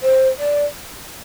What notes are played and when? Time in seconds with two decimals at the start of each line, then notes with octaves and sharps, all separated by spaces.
0.03 C5
0.39 D5